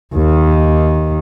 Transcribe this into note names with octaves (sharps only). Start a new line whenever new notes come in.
D#2 D#3